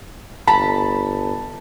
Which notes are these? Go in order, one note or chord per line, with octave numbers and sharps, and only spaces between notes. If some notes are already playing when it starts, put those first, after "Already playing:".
G1 A5 B5